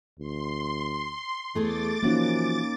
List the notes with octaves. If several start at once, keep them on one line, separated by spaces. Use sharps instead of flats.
D2 C6
E2 A3 G#4 A4 D6 A6
E3 F3 A#3 C#4 D#4 F#4